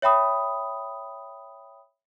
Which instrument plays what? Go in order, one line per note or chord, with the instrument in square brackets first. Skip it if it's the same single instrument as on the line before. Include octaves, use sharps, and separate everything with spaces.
[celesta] C#5 E5 G5 B5 D#6